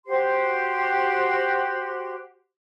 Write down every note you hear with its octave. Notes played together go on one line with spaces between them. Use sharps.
F#4 G4 C5 C6